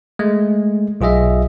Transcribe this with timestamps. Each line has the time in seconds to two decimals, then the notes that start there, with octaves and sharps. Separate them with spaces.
0.19 G#3 A3
1.01 B1 F4 G#4 D#5 E5